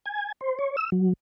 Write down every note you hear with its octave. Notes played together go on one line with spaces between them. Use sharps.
G#5
C5
C#5
E6
F#3